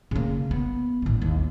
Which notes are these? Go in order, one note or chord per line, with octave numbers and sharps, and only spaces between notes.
C#3 A#3
B3
A1 D3
D#2